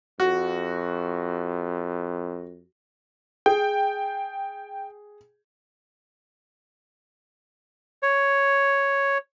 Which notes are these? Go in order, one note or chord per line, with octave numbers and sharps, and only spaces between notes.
F2 F#4
G#4 G5
C#5